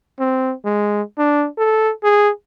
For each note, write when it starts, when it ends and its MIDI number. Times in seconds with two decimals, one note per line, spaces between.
0.19 0.53 60
0.65 1.02 56
1.18 1.46 62
1.58 1.91 69
2.04 2.29 68